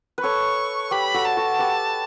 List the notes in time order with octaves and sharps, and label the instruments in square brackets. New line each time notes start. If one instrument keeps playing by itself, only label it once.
[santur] B4
[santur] A4 C#5 [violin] C#6
[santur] G4 B4 [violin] B5
[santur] F#4 A4
[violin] A5
[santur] F#4 A4
G4 B4